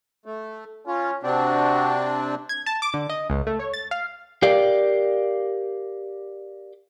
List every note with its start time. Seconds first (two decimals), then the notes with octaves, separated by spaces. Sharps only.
0.26 A3
0.87 C#4 F4
1.23 C3 C4 D4 F#4
2.49 G#6
2.66 A5
2.82 D6
2.94 D3
3.09 D#5
3.30 C#2
3.47 A3
3.59 C#5
3.74 A6
3.91 F5
4.42 G4 A#4 D5 F5 G5